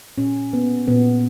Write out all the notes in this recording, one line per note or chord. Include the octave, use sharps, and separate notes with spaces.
A#2 C#4
A#3 B3
A#2 B3